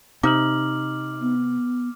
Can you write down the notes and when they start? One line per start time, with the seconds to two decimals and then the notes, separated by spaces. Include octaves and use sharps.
0.23 C3 D#4 D6 F6 F#7
1.21 B3